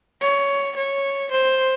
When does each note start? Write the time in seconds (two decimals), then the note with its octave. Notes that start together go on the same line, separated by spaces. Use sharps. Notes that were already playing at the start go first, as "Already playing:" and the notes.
0.22 C#5
0.76 C#5
1.31 C5